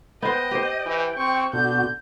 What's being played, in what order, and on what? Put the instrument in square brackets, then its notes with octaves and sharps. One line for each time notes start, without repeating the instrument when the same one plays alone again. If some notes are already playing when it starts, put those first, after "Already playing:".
[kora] B3 C5 [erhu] D#5 [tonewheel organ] G5
[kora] G4 C5
[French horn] E3
[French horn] C4 [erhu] C#6
[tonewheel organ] B2 F#4 [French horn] D3 [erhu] G6